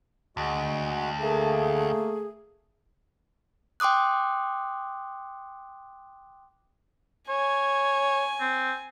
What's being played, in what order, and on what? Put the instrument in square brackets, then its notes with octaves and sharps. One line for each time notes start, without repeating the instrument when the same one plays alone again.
[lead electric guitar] D2 [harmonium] G#3 F#4
[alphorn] A3 [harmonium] A#3 [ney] G#4
[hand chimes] G5 C6 D6 D#6 F#6
[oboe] C#5 [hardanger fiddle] G#5
[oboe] C4